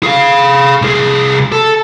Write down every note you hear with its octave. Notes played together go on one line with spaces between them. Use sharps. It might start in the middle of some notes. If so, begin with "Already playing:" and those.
G#4 F5
C2 G#4
A4